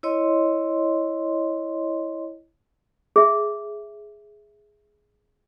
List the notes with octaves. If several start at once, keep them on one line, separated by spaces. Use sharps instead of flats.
E4 C#5 D#5 C6
G#4 E5